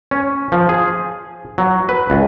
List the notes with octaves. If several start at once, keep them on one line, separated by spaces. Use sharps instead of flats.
C#4
F3
G#4
F#3
B4
C#2